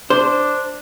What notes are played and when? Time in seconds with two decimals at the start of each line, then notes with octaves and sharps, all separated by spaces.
0.10 D4 C5